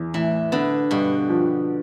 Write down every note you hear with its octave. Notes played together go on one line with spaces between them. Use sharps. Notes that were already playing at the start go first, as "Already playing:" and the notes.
Already playing: E2
A2 E3
D3 B3
G2 B2
F3